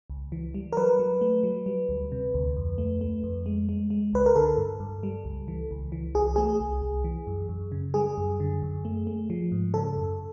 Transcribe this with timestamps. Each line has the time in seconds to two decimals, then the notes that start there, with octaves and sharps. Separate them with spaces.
0.10 C#2
0.32 E3
0.54 G3
0.73 A#4
0.77 F#3 B4
0.99 F#3
1.21 A3
1.43 F#3
1.66 G3
1.89 D2
2.12 C3
2.34 D2
2.57 F2
2.78 A3
3.01 A3
3.23 F2
3.46 G#3
3.69 G#3
3.90 G#3
4.13 C#2 B4
4.26 A#4
4.36 D3 A4
4.58 G2
4.80 G2
5.03 G3
5.25 C#2
5.48 E3
5.71 C#2
5.92 E3
6.15 C2 G#4
6.36 A3 G#4
6.60 C2
6.82 C2
7.04 E3
7.27 F#2
7.49 F#2
7.72 C#3
7.94 G3 G#4
8.18 F#2
8.40 D3
8.62 F#2
8.85 A3
9.07 A3
9.30 F3
9.52 G#2
9.74 C#3 A4
9.97 F#2